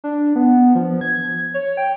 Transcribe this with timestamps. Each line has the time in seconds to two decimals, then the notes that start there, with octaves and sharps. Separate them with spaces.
0.04 D4
0.36 B3
0.75 F3
1.01 G#6
1.54 C#5
1.77 G5